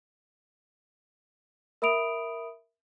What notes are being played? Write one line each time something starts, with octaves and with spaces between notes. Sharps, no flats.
A#4 E5 B5 D#6 D7 F7